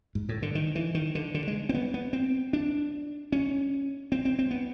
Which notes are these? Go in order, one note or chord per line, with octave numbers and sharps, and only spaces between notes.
G#2
A2
D3
D#3
E3
D#3
D3
D3
G#3
C4
B3
B3
C4
D4
C#4
C4
C4
C4
B3